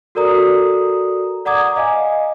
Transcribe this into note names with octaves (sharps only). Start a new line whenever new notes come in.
F#4 A4 A#4 D5 A#5 D#6
D5 F#5 A#5 D6 D#6 G#6
D#5 F5 G#5